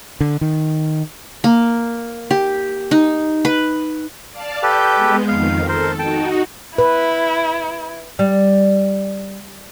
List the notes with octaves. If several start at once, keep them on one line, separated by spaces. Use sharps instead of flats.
D3
D#3
A#3
G4
D#4
B4
D5 F5 A5
G4 A4 B4 G6
G#3 B3
F2 D#3 F5
A4 A#4 C5
D#4 F#4 G5 A5
E4 B4
G3